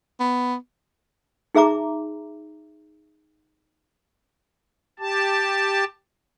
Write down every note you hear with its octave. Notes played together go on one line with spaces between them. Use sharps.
B3
D#4 G#4 E5 A#5 D6
G4 A5